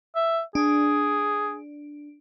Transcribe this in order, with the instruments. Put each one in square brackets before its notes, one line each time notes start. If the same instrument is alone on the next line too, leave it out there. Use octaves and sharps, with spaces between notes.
[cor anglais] E5
[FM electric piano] D4 [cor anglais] G#4